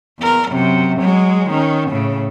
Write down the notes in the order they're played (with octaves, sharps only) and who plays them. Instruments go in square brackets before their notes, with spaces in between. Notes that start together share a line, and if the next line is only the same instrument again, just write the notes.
[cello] E2 A#4
F#2 C3
F#3 G#3
D#3 C#4
A2 C#3